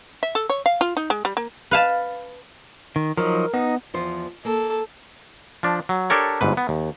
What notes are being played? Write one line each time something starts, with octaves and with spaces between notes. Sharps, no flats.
E5
A4
C#5
F5
F4
D#4
G#3
G3
A#3
B4 F5 A5
D#3
F3 F#3 D#4 A#4
B3 D#4
E2 F3 C5
A#3 A4
F3 D4
F#3
D4 G4 A4 A#4 C#5
G1 G#2 B4
B3
D#2